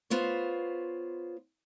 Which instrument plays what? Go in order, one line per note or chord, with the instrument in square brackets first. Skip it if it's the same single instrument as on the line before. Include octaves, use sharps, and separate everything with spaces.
[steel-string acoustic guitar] B3 F4 C5 C#5